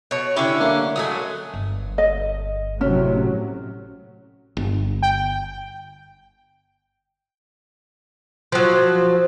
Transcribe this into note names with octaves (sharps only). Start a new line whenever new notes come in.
B2 C#5
D3 C#4 E4 G4 C#6
A3 A#3
F#3 G#3 A3 G#5 D#6
G1
D#5
A2 C3 F#3 C#4
G1
G5
F3 F#3